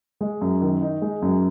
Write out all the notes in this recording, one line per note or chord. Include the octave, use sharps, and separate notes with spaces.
G#3
F#2
D#3
D#4
G#3
F#2